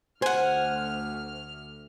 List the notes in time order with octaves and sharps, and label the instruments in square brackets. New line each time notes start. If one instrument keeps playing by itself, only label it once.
[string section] D2 F6 [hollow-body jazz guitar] C5 [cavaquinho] F#5 G#5